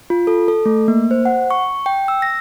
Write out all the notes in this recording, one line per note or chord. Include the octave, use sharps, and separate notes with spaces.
F4
A4
A4
A3
A#3
C5
F#5
C#6
G5
E6
A#6